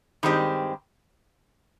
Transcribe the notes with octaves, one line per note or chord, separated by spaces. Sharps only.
G2 D#3 G#3 C4 G4